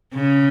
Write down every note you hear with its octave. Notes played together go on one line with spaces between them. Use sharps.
C#3